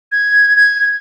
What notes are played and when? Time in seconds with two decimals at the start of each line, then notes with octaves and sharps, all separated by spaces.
0.12 G#6
0.57 G#6